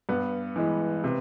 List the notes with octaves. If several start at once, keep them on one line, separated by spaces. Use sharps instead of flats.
G2 B3
E3 G#3
C3